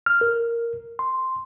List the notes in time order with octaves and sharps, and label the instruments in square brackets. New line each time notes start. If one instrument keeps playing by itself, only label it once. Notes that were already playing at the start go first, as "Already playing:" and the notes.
[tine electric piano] F6
A#4
C6